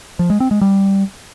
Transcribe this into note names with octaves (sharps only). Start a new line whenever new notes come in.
F3
G#3
C4
G#3
G3